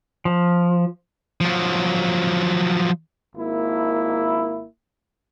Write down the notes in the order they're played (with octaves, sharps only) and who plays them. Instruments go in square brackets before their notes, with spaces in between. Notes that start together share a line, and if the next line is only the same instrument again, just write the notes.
[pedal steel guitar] F3
[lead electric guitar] F3 F#3
[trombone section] G#1 A#3 E4